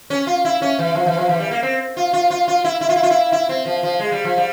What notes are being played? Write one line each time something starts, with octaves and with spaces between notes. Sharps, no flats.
C#4
F4
E4
C#4
E3
F3
E3
F3
E3
G3
A#3
C4
F4
F4
F4
F4
E4
E4
F4
E4
F4
E4
E4
C4
F3
F3
G#3
G3
F3
G3